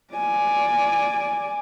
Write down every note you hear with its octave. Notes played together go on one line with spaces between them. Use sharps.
D5 G#5